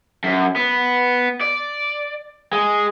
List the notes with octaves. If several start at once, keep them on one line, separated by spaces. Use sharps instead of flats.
F#2
B3
D5
G#3